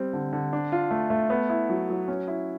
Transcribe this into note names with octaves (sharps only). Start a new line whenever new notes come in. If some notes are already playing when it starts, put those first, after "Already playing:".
Already playing: G3 C4
D3
D3
D4
F4
A3
A3
B3
E4
F#3
F#3
C#4
E4